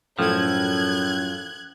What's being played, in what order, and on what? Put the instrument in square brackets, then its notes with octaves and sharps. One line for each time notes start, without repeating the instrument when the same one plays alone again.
[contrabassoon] F#2 [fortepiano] A2 [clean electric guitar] F3 [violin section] F#6 G#6